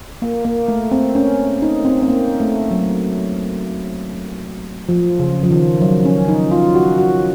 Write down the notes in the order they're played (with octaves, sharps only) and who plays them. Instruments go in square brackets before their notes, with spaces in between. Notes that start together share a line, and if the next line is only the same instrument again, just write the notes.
[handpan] A#3
A#3
A3
C4
C#4
D#4
C4
C4
A#3
A3
F#3
F3
C#3
F3
D#3
F#3
C#4
D#4
F4
F#4
F#4